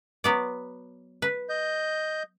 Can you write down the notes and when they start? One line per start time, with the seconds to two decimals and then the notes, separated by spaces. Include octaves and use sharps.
0.24 F#3 B3 D5
1.22 B4
1.49 D#5 G6